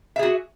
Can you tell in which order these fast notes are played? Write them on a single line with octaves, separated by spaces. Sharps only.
E5 G#4 F#4